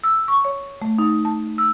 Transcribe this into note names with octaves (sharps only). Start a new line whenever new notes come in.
E6
C#6
C#5
A3
D#4
A5
E6